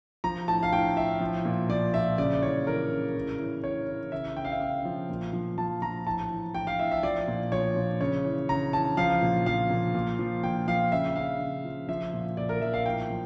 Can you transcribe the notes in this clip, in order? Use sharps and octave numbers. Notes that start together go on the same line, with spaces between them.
F3 A#5
A2 A5
F5
A2 G5
A2 E5
F3
A#2
F3 D5
A#2 E5
C#3 D5
D5
E3 C#5
E3 A#4
C#3
A2
E3
A2 C#5
E3
C#3 E5
C#3 G5
F5
E5
C#3 F5
F3
A#2
F3
F3 A5
F3 A#5
A2 A5
E3
A2 G5
F5
A2 E5
E5
F3 D5
A#2
F3 C#5
A#2
C#3 C#5
E3
C#3 A#5
E3 A5
F3 F5
A#2
F3 F5
A#2
A#2
F3
A#2 G5
F3 F5
C#3 E5
C#3 F5
C#3
F3
F3 E5
A#2
A#2 D5
A#4
F3 E5
F5
A2 G5
F3